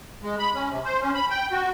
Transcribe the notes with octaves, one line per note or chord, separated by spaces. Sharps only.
G#3
B5
C#4
C3
C5
C#4
B5
G5
F#4